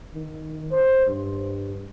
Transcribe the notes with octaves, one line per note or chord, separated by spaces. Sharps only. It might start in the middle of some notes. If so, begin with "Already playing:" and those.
D#3
C5
G2